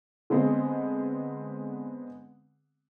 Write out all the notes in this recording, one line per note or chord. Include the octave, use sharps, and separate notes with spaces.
D3 G#3 B3 C4 G#4